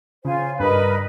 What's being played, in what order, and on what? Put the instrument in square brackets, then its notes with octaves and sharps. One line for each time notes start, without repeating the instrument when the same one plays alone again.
[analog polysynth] C#3 [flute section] F4 C5 G#5
[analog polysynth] G2 [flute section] A#4 D#5 B5 [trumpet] B4